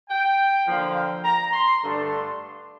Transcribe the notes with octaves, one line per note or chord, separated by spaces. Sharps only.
G5
D3 F3 A#3 F5
G5
A#5
C6
G2 D3 A3 D4
C6